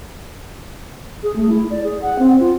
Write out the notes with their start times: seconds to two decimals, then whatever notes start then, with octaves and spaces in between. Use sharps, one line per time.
1.23 G#4
1.36 A3
1.49 E4
1.70 D5
1.84 G#4
2.02 F#5
2.19 C4
2.40 F4